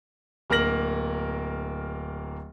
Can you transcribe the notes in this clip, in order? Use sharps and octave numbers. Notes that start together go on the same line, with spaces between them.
D1 A#3 A#4 F6 A#6 F#7